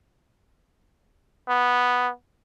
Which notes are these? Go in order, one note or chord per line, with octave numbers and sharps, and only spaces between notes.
B3